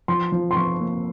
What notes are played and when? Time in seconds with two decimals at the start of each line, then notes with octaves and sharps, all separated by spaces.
0.08 F3 C6
0.32 F3
0.51 C6
0.56 F3 C#6
0.80 A#3